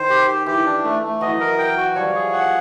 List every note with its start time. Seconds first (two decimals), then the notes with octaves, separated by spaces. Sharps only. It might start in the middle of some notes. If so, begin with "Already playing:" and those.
Already playing: D#3 C5
0.10 G4
0.28 G4
0.46 E3 G4
0.66 D4
0.84 A3
1.02 A3
1.21 E3 F#3 D#5
1.40 A#4
1.59 G5
1.77 F#4
1.95 F3 G3 C#5
2.15 G#4
2.33 F#5